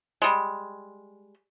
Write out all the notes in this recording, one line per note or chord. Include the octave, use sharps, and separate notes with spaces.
G3 G#3